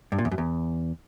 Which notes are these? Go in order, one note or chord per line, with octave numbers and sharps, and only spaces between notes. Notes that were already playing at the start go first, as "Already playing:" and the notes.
G2
A#2
E2
F#2
E2